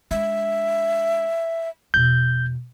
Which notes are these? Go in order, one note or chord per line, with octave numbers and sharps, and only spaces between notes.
G#3 D4 E5
E2 B2 G6